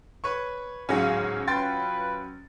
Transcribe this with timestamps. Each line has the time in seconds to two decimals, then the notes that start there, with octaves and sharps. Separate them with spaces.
0.24 B4 C#5 C#6
0.89 D1 G#2 F#3 G#3 C#4 F5
1.48 F4 B4 G5 C6 A6